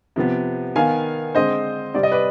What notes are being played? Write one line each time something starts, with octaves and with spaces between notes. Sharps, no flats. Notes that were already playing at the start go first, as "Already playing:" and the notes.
C3 F3 B3
D#3 B3 F5 G#5
D3 G#3 C4 C5 D#5
C3 G3 C4 D5
D#5
B4 D5